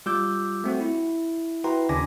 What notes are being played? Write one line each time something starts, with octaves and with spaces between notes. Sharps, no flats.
G3 F4 D6 E6 G6
A3 C4 F#4
E4
E4 F#4 B4 G5 A#5 C6
D#2 C#3 D4 G#5 D6 A#6